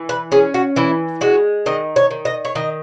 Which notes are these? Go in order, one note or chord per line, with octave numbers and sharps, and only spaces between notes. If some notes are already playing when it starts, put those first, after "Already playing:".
Already playing: E3
B4
C#4 G#4
F#4
E3 E4
G#3 F#4
D#3 D#5
C#5
D#3
D#5
C#5
D#3 D#5